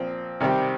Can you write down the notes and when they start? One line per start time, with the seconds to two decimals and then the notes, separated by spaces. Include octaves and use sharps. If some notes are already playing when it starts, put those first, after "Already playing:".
Already playing: A#2 F3 C4
0.40 C3 D#3 G3 C4 G4